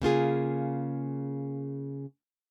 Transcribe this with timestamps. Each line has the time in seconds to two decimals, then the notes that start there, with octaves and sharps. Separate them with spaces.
0.02 C#3 A#3 F4 G#4